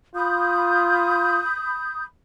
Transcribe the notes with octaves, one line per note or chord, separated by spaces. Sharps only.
F4 B5 D#6 G6